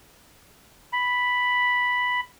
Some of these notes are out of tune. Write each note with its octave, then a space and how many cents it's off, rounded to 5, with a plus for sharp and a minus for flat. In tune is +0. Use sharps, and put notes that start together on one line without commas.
B5 +0